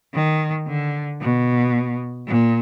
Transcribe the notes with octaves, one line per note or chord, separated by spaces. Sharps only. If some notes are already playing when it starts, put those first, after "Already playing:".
D#3
D3
B2
A#2